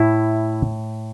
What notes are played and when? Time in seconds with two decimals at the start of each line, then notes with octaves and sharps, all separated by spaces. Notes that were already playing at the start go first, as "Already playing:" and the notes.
Already playing: A2 E4